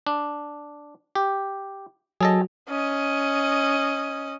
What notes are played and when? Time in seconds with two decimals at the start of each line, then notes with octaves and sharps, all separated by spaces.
0.07 D4
1.15 G4
2.21 F#3 G#4 A4 D#5
2.69 C#4 D#5